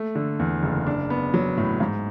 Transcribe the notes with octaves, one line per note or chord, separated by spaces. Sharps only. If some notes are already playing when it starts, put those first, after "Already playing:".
Already playing: A3
D3
E2
F#1
D4
B3
F#3
A2
G#2